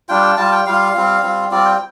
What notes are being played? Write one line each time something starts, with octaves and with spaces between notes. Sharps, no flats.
G3 D4 F4 G5
G5
G3 F4 A5
G5
G3 F4 F5
G3 C4 F4
G3 C4 F4
G3 C4 F4 D5
G5